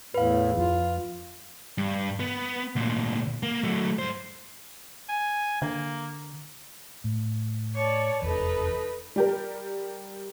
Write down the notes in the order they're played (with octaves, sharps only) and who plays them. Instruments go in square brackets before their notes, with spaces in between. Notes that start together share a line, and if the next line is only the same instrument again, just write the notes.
[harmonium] E2 A2 [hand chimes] B4 F5
[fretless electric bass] F2 [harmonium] F4
[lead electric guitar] G2
B3
D2 A#2
A#3
F#3 A3
G2 C5
[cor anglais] G#5
[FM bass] D3 [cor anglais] A#3
[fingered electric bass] A2
[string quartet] C#5 D5 A5
[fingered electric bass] F1 E2 [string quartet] D#4 A4 B4
[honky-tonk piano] G3 G4 A#4